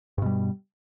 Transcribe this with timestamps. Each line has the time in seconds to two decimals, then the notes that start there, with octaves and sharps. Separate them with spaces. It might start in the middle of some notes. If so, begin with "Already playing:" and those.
0.18 G2
0.22 B2
0.26 G3